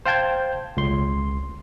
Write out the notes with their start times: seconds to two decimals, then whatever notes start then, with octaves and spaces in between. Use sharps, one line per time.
0.05 C5 F5 G5 A5 G6 G#6
0.77 C#2 C6